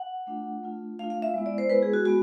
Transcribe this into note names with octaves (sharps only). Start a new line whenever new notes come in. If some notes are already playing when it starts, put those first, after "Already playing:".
Already playing: F#5
A3 D4 F4
A3 D4 F4
A3 D4 F4 F5
F5
E5
G#3 B3 E4
D5
C5
G#3 B3 E4 B4
G#4
F#4
G#3 B3 F#4